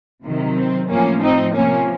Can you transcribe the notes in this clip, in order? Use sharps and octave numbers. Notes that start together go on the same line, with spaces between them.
C3 D#3 F#3
C4
A2 F3 A#3 C#4
C4 D#4
C3 F3 A#3 C#4